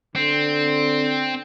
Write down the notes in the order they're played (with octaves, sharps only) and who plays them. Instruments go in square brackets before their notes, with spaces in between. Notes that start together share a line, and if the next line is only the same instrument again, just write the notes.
[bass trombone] D3 [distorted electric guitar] C4